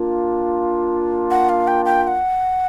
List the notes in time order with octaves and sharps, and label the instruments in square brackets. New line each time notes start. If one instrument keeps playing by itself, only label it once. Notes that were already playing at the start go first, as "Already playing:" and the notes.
Already playing: [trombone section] A#3 D4 F4
[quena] F#5
F5
G5
G5
G5
F#5